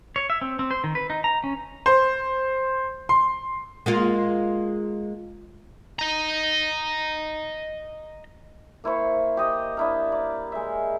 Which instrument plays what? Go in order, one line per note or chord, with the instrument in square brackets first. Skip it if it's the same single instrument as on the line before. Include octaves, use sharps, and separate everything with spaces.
[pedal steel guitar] C#5
E5
C4
C4
C5
D#3
B4
D#4
A#5
C#4
[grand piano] C5
C6
[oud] G#3 A#3 F4
[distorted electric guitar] D#5 A#5
[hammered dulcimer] A#3 E4 C5 C#6
G4 D#5
D4 E4 A#4
D5
G#3 E5